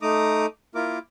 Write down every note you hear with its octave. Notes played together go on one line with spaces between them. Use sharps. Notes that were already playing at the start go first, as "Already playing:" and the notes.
A3 D#4 A#5 D6 D#6
A#3 E4 F4 A#4 D6